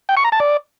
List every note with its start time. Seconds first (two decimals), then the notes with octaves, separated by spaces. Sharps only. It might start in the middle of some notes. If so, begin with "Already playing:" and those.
0.09 G5
0.17 C#6
0.24 A#5
0.32 A5
0.40 D5